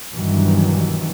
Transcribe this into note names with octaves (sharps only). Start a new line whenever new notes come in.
G2 B2 D#3 E3 F#3